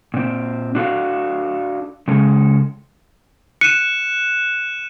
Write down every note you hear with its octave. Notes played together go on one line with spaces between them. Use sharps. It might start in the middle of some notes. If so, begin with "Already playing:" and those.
A#2 C4
D4 F#4 A4 F5
C#3 G#3 A4
F#6 C#7 D#7 E7